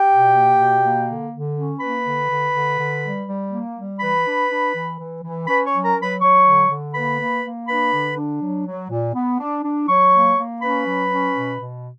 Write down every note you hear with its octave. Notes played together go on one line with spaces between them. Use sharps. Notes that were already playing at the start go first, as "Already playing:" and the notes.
Already playing: G4 G5
B2
A#3
B2
A#3
D3
D3
C#4
A#3 B4 B5
D3
D3
D3
D3
G3
G3
A#3
G3
E3 B4 B5
D4
D4
E3
E3
E3
C#4 B4 B5
C#5 C#6
F#3
A#4 A#5
F#3
B4 B5
F#3 C#5 C#6
D3
D3
A#3 B4 B5
A#3
A#3
D4 B4 B5
D3
D4
F#3
F#3
A#2
B3
D4
D4
F#3 C#5 C#6
A#3
A#3
C#4 B4 B5
F#3
C#4
B2
B2